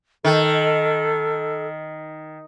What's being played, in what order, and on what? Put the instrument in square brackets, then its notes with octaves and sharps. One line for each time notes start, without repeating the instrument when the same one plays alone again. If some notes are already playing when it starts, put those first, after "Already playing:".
[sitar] D#3 [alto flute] A4